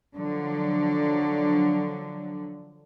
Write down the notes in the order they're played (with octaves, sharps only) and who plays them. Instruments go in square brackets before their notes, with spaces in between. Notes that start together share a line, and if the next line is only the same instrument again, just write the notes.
[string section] D3 F3 F#3